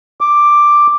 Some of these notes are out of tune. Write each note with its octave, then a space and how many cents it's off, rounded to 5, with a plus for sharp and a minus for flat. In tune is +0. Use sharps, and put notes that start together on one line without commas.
D6 +5